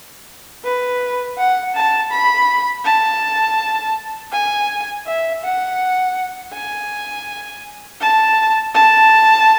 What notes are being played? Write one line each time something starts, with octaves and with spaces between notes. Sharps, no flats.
B4
F#5
A5
B5
A5
G#5
E5
F#5
G#5
A5
A5